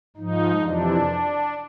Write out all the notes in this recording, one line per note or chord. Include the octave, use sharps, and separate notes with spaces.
G#2 F3 D#4
F2 C3 E3 D4